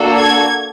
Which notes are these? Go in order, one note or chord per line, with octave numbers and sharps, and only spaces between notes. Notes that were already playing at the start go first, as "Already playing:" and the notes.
Already playing: A#3 D4 F#4 A4
G#6